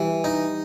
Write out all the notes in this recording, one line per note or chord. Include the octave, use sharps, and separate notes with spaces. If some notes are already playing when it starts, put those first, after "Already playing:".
Already playing: E3 G3
D#4